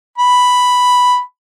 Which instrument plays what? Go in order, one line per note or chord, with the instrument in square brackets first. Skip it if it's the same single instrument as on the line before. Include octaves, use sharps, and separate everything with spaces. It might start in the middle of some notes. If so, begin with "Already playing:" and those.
[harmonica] B5